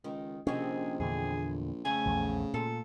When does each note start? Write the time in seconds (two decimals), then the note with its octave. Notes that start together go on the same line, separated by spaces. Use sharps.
0.04 C#2 D#3
0.47 A#1 C3 D#3 C#4 G#4
1.00 E2 A#2 D3 G#4
1.85 F2 C#3 A3 G#5
2.06 A#1 E2
2.54 A#2 F4 A4